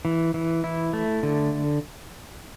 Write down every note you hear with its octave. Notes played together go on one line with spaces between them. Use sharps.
E3
E3
E4
A3
D3